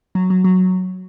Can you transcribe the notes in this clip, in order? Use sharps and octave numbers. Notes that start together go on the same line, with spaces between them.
F#3
F#3
F#3